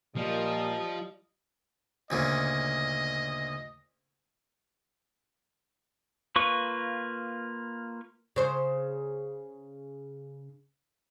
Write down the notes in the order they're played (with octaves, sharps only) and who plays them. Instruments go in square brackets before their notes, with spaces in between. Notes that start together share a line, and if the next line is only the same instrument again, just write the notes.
[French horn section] A#2 [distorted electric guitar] F3 [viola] G3 D#5
[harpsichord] D2 A#2 C#3 [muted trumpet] D#5
[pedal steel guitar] A#3 F4 B4 C#6
[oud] C#3 C5